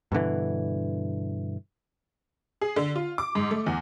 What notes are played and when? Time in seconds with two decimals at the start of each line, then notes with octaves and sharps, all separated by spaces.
0.12 G2 B2 D3 E3
2.61 G#4
2.76 D3
2.96 F4
3.18 D6
3.35 G#2
3.51 A3
3.66 E2